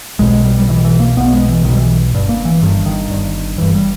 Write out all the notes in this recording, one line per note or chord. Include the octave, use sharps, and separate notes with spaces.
B1 B2 G#3
G3
G3
B1 B2 E3
E3
A#3
B1 B2 B3
G#3
E3
B1 B2 D#3
G3
E3
G1 G2
A#3
E3
G1 G2 D#3
D#3
G1 G2
G1 G2 E3
G3